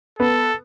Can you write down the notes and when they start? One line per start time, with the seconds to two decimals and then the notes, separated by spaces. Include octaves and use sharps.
0.19 B3 A4